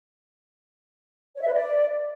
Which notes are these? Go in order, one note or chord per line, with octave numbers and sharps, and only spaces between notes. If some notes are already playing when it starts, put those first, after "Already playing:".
C#5
E5
B4
D5